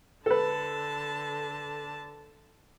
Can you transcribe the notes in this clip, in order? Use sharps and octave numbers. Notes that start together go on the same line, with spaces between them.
D3 A4 B4 A5